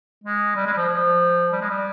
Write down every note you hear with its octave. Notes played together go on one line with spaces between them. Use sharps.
G#3
G3
G#3
G3
F3
F3
G3
G#3
G3